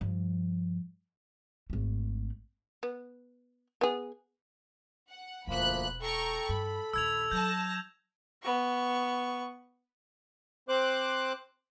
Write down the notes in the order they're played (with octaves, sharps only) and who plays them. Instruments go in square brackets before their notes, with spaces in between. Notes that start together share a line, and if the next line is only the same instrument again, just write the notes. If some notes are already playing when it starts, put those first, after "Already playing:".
[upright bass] G2 F3
G#1 A3
[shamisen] B3
B3 G#4
[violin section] F#5
[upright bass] E1 B3 [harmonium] D2 F3 A#3 [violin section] B5 F#6
[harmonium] A4 [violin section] G5 A#5 C#6
[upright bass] G2 [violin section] B5
[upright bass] A#1 D#2 [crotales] E6 G#6 F7
[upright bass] F#3 [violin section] A5 A#6 [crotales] G6
[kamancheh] B3 C#6
[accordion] C4 C5 D6 F#6